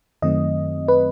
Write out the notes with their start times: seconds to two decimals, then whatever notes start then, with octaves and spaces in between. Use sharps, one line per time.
0.22 F#2 D#3 F#3 A3 C4 D#5
0.88 B4